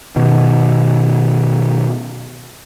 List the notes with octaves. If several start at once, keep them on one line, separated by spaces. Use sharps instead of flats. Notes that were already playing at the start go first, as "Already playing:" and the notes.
B2 D#3